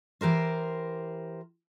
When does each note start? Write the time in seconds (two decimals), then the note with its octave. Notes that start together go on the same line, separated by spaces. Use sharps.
0.21 E3 G4 A#4 C5